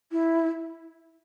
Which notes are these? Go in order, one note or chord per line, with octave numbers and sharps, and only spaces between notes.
E4